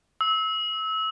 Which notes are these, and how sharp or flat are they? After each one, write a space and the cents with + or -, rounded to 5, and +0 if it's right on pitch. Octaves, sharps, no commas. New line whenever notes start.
E6 -25